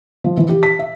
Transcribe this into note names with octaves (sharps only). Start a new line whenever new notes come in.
F3
E3
G4
B6
E5